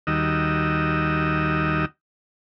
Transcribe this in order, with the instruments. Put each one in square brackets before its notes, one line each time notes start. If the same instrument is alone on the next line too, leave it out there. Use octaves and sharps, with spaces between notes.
[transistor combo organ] D#2 D#3 G3 F#4 D#5 E6